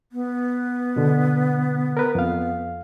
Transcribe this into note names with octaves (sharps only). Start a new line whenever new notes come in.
B3
B2 D3
A#4 B4
F2 F5